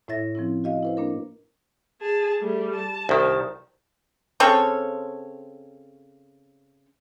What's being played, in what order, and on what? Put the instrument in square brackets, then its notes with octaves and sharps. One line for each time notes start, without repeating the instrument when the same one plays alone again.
[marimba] A2 E4 C#5 E5 A6 A#6
F3 C4 C#4 E4
F#4 D#5 F5
E4 B4 C5
A#3 D4 A#4
[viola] G#4 A5
G3 A3
A5
[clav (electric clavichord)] C2 D#3
[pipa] C#3 C4 A4 C#5